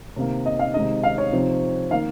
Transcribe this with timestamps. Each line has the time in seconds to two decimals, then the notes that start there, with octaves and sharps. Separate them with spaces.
0.16 C3 D#3 A#3
0.46 D#5
0.59 F5
0.74 C3 D#3 G#3 D#4 D#5
1.03 F5
1.18 C#5
1.32 C3 F3 C4 D#4
1.91 D#3 A#3 F5